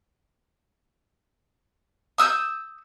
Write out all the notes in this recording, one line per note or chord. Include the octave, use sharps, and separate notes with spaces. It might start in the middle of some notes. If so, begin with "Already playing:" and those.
D#6 E6 F#6 G6